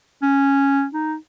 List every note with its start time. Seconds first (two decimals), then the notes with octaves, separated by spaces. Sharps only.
0.22 C#4
0.93 D#4